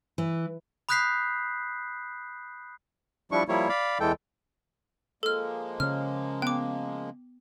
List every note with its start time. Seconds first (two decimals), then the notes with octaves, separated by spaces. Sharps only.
0.18 E3
0.89 B5 D#6 F#6 G6 B6 C7
3.32 F3 G3 D4 E4 C#6
3.49 F3 G3 A#3 E4 C#5
3.69 D5 F5 B5
4.00 E2 E3 G#3 A4 G5
5.23 F3 G#3 A#3 A4 F6
5.80 C#3 C#4 F6
6.42 B3 G5 D6